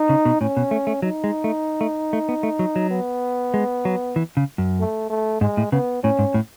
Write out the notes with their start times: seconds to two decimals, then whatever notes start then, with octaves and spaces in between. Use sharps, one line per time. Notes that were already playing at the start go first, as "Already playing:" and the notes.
Already playing: D#4
0.09 C#3
0.25 B2
0.41 A2 C#4
0.57 B2
0.71 A3
0.87 A3
1.02 F#3 D#4
1.24 G#3
1.44 A3
1.81 A3
2.13 A3
2.29 B3
2.43 A3
2.59 F#3
2.76 F#3
2.90 B3
3.54 G#3
3.85 F#3
4.16 E3
4.37 C#3
4.58 F#2
4.79 A3
5.09 A3
5.41 G#2 G#3
5.57 A2
5.72 C#3 B3
6.03 A2 C#4
6.19 G#2
6.34 A2